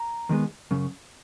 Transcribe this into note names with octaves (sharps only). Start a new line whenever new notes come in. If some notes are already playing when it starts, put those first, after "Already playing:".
Already playing: A#5
D#2 D#3 G#3 B3
F#2 C#3